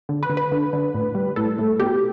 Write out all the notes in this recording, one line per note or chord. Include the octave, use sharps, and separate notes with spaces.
D3
B4
D3
B4
D3
D3
A2
G3
A2 A4
A2
B2 G4